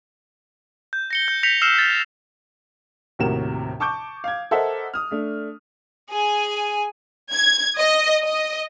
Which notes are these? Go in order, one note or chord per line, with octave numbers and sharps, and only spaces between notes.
G6
A#6 C#7 G7
G6
G6 A#6 B6 C#7 F7
E6 F6 C7 C#7 E7
A6
D#2 A2 C3 F#4 A#4 E7
A5 C#6 D6 G6
F5 G#6
A4 A#4 C5 D#5 E5 F#5
D#6 F6
A3 D4
G#4 G#5
G#6
D#5
D#5